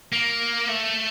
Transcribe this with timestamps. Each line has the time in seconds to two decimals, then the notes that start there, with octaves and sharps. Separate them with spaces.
0.12 A#3
0.68 A3